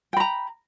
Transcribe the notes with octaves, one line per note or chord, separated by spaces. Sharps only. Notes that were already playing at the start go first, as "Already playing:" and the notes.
G5 A#5 B5